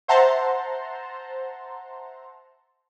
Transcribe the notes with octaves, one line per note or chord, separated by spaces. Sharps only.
C5 E5 F#5 A5 A#5 C6